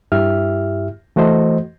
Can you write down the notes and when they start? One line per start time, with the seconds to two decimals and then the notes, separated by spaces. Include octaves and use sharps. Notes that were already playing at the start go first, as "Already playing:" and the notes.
0.12 G2 E4 G4 E5 F6
1.16 E3 A3 F#4 C5 D#5